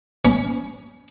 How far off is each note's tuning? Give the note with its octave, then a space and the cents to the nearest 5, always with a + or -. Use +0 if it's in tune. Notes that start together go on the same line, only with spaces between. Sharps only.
C#4 +15